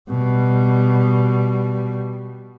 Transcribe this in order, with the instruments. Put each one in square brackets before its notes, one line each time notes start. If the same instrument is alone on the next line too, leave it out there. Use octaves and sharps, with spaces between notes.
[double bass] B2 G3